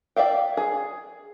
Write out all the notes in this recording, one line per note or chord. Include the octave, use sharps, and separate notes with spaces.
D5 E5 F5 G5
G#4